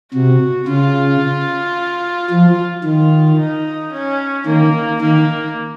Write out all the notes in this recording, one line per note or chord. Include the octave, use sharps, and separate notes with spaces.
C3 F#4
C#3 F4
F3
D#3 F4
D#4
C#4
D#3 A#3
D#3 A#3